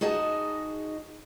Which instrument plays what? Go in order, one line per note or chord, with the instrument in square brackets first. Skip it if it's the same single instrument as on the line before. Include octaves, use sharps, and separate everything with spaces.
[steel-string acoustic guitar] D#4 F#4 G#4 D#5 A5